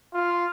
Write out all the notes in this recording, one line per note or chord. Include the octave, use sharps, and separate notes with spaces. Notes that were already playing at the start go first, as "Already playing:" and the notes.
F4